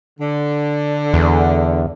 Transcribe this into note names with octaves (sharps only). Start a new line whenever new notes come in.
D3
E2